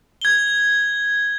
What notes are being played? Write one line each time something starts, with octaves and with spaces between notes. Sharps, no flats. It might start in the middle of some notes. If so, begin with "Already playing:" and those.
G#6 G7